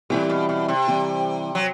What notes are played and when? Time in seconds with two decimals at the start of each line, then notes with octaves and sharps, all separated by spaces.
0.10 A2 E3 G3 C4 E4 G4
0.30 B2
0.49 B2
0.68 C3
0.88 E3 G3 C4 E4 G4
1.55 F#3